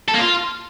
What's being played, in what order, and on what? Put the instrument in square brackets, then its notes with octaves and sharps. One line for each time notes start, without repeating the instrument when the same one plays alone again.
[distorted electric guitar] A4
A#3
F4